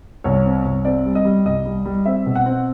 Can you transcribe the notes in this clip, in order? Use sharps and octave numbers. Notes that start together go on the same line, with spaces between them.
C2 C#5
C4
C2
C4 D5
G3
D#5
G3
C2 D#5
G3
G3
C4 E5
B2
F#5
C4